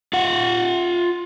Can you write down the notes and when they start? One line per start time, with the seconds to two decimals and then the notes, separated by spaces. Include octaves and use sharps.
0.13 F4 F#5